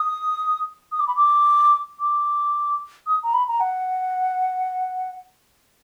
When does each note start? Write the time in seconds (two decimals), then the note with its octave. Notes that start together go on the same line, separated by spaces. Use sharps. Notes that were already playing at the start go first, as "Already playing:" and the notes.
Already playing: D#6
0.92 D#6
1.00 D6
1.07 B5
1.16 D6
2.00 D6
3.07 D#6
3.23 A#5
3.34 B5
3.48 A#5
3.60 F#5